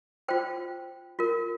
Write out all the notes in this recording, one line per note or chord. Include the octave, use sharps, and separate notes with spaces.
F4 C5 G5
F4 A#4